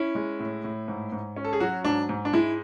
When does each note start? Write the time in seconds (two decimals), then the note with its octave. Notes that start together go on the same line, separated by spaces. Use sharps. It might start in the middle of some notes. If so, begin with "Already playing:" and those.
Already playing: C#4 E4
0.15 G#3
0.40 A2
0.64 A2
0.88 G#2
1.12 G#2
1.36 C#4
1.45 A4
1.53 G#4
1.60 F#3 F#4
1.84 G#2 D4
2.09 G#2
2.25 D4
2.33 G#3 E4